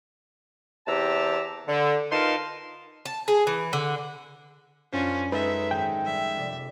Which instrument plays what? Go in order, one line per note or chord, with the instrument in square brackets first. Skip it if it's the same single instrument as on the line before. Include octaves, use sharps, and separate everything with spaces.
[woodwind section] E2 C3 G4 A5 A#5 E6
D3
D#4 F4 A#4 B4 A5 C6
[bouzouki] A5
G#4
E3
D3
[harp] F#2 [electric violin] C#4 [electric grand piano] D4 F4 C5
[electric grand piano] G#3 D#4 A4 [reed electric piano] B4 [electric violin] E5
[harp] G#1 [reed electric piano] G5
[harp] G3 E6 [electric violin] E5
[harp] F1 C3 D5